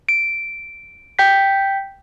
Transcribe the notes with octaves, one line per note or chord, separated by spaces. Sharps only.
D7
G5 G6 B6